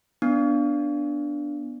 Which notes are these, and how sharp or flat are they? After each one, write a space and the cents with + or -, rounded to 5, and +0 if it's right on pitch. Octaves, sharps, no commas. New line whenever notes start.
B3 +0 D4 +0